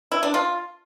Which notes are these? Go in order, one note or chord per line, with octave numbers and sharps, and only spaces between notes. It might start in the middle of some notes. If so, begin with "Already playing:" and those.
E4
D4
F4